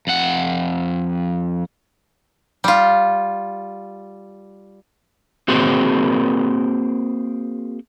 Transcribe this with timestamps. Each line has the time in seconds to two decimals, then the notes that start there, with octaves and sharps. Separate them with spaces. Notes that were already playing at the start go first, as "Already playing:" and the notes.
0.07 F2 F#5
2.64 G3 F4
5.48 A#3 C4 F#4 G#4 A#4 C5